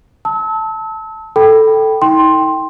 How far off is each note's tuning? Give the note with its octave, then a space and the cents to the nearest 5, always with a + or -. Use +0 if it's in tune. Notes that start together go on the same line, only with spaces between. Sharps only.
A5 +0 E6 -35
A4 +0 G5 -10 B5 +0
D#4 +40 G5 +0 C6 +10